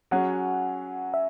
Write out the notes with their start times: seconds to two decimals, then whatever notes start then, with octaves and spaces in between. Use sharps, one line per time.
0.11 F#3 C#4 G#4 F#5
1.14 E5